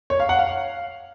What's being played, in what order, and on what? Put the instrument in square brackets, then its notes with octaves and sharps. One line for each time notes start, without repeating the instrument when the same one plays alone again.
[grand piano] C#5
F5
F#5
F5